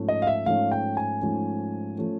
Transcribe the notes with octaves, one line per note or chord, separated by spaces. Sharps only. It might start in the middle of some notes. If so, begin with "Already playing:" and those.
Already playing: G#2 F3 A3 C#4
D#5
F5
E5
G#2 F3 A3 C#4 F5
G5
G#5
G#2 F3 A3 C#4
F3 A3 C#4